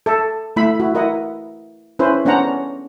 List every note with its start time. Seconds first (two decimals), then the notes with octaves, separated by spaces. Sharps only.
0.06 A4 E5
0.56 A3 E4 E5 B5
0.80 E4 F#4
0.95 E4 A#4 D#5 F#5
1.99 C#4 E4 B4 C5
2.25 B3 C#4 D4 C5 F#5 A#5